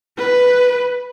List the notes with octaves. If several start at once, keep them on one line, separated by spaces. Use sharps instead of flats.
B4